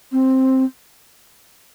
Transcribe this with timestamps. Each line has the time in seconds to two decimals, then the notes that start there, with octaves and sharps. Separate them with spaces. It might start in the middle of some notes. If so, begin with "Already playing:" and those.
0.12 C4